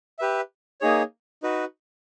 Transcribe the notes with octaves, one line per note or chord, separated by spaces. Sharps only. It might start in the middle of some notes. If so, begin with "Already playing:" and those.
G4 B4 E5
A#3 D#4 G#4 C#5
D#4 F#4 B4